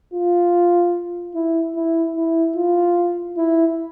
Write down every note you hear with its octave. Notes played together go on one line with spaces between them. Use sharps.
F4
E4
E4
E4
F4
E4